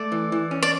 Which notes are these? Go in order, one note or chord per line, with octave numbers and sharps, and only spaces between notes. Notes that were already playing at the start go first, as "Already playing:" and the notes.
Already playing: A3 D5
E3
E3
C#4
D5